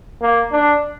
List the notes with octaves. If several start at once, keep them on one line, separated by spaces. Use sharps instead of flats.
A#3
D4